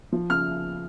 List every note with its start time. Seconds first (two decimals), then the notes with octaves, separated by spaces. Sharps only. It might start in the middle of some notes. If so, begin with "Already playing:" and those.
0.12 F3
0.30 C#3 F6